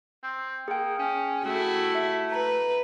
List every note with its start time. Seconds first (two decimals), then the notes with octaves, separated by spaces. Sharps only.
0.23 C4
0.68 A#3 G#4 G5
0.99 C#4
1.45 A3 E4 F#4
1.95 E5
2.32 B4 A#5